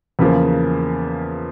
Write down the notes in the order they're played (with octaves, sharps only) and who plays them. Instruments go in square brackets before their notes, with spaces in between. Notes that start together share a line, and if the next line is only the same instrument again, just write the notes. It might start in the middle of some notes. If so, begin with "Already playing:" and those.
[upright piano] E2 C#3 F3 A#3